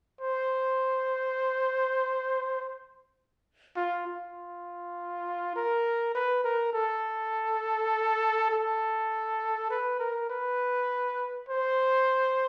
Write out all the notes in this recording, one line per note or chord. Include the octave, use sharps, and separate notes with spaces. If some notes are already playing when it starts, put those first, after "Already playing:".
C5
F4
F4
A#4
B4
A#4
A4
A4
B4
A#4
B4
C5